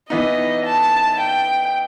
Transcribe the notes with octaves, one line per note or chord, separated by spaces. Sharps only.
E3 B3 D#4 D#5
A5
G5